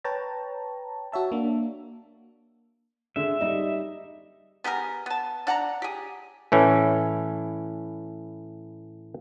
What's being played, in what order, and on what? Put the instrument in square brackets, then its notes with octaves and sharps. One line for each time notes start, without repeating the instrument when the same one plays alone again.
[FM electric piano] B4 C#5 G5 A5 A#5
F#4 C#5 E5 A5
A#3 D4
[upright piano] D3 G#3 [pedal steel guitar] E5
[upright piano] G3 D#4
[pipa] B3 G4 G#4 A#4
B3 A5
D4 F#5 A5 A#5
G4 G#4
[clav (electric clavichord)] A2 E3 C#4